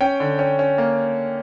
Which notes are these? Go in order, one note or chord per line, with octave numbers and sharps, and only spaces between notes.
C#4 G5
D3
C#4
C#4
A#3